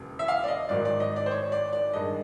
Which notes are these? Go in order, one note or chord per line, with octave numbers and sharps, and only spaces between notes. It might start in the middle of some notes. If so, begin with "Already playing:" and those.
Already playing: E1 D#2 C#3
E5
F5
D5
D#5
G#1 G#2 D#3 F#3 D5
D5
D#5
D5
C5
C#5
D5
D5
G2 D#3 G#3 D#5